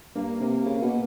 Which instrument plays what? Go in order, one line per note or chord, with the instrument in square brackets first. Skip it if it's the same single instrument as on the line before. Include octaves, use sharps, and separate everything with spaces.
[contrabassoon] G2 [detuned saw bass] A#3
[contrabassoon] C3
C#3
B2